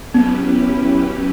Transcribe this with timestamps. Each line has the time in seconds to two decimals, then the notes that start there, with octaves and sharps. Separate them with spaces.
0.14 F#3 B3 C#4 E4 G4 B4